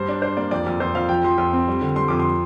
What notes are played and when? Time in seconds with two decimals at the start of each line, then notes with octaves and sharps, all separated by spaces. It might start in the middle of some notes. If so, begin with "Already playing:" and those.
Already playing: G2 C5
0.08 D4
0.22 D4 C5
0.37 A#3 D5
0.51 F2 D5
0.67 F2
0.80 F2 C5
0.95 F2 F5
1.09 F3 G5
1.24 F3 C6
1.38 F2 C6
1.53 C4
1.68 G3
1.81 D3
1.96 G3 C6
2.08 F2 D6
2.20 C6